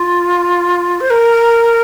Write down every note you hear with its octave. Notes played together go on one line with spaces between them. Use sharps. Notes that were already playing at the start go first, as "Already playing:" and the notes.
Already playing: F4
C5
A#4